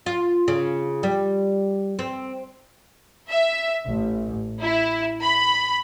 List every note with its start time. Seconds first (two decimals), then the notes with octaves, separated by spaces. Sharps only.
0.06 F4
0.48 C#3
1.03 G3
1.99 C4
3.30 E5
3.88 A1
4.62 E4
5.23 B5